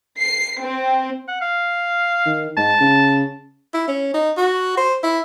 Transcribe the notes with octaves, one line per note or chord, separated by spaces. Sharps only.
C7
C4
F#5
F5
D#3
G#2 A5
C#3
E4
C#4
D#4
F#4
C5
E4